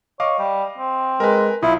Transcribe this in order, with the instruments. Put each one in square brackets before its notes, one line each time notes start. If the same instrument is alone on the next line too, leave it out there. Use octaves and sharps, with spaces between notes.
[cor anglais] C#5 [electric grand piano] D#5 F5 D6
[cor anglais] G3
C4
[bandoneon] G#3 [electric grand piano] A#4 B4
[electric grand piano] B1 F4 D#6 [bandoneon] E4